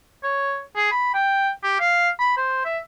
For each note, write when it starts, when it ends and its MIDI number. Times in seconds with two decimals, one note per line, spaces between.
0.24 0.60 73
0.76 0.87 68
0.92 1.13 83
1.14 1.49 79
1.63 1.76 67
1.80 2.09 77
2.19 2.33 83
2.37 2.61 72
2.65 2.79 76